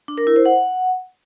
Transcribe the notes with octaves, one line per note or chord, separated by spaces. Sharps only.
D4
A#4
E4
C5
F#5